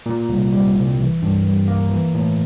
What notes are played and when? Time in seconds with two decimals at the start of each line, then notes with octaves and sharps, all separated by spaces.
0.06 A#2
0.29 C2
0.52 G3
0.75 C2
0.99 E3
1.22 G2
1.44 G3
1.68 A#3
1.91 E3
2.15 A2